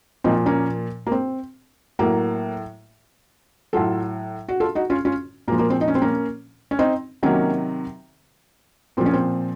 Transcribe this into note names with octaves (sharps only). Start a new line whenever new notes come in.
A#2 F3 C4 D#4
A#3 C#4
A#3
C4
A2 F#3 A#3
A2 F#3 F4 A4
F#4
F4 A4
D#4 F#4
C#4 F4
C#4 F4
A#2 F3 A#3
A#3
C4
D#4
C#4
C4
A#3 C#4
C#4
C4 D#4
C3 D#3 F#3 A#3 C#4
A#2 F3 C4
C#4
C4